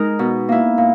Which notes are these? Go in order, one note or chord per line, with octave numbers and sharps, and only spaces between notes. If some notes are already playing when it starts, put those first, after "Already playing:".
Already playing: G#3 D#4 A#4
B2
A#3 E4
A#2